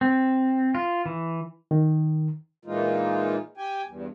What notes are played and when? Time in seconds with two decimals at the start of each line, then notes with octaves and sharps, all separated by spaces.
0.01 C4
0.75 F4
1.06 E3
1.71 D#3
2.65 A#2 E3 G#3 A#3 D#4 F4
3.57 G4 G5 G#5
3.86 E2 G2